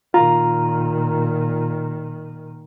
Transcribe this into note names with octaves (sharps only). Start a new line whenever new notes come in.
A#2 D#3 F4 A#5